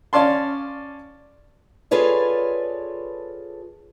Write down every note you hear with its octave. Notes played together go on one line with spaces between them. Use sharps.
C#4 D5 F5 A5 C6
F4 G#4 A4 B4 C#5 D5